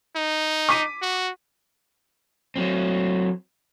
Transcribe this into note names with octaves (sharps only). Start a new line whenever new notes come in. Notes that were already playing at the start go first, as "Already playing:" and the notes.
D#4
D6 B6 D#7
F#4
F#3 C4